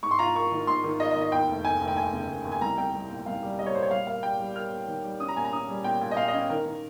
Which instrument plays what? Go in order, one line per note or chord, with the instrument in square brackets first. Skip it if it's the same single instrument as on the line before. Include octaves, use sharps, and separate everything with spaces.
[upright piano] G#2 C#6
C6
F4 A#5
A#3 C#6
D#3
G#2 C6
D#3
F4 D#5
D#5
D#3
D#5
D#2 G5
F1
F1 G#5
F1
G5
D#2 G#5
C#3
F1
D#2
G#5
C2 A#5
C2 G5
C2
A#2
C2 F5
G3
G3 D#5
C#5
A#2 C5
C#5
G3 F5
A#3 F5
G3 G5
G3
A#3 F6
A#3
D#3
G3
C#4 D#6
A#5
A#2 G#5
A#5
C#4 D#6
G3
A#2 G5
A#2
D#5
A#2 F5
D#5
C#4
D#3 A#4
D#3